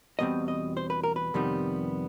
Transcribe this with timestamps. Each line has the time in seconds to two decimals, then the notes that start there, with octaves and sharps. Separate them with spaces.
0.19 E2 B2 G3 C4 D#5
0.48 D#5
0.77 C5
0.90 B4
1.04 A#4
1.16 B4
1.34 F2 C3 D#3 G3 B3